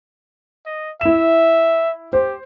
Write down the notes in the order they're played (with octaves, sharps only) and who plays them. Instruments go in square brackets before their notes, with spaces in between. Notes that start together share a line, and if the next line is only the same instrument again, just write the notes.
[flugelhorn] D#5
[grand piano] E4 E7 [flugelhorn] E5
[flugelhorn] G4 [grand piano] C5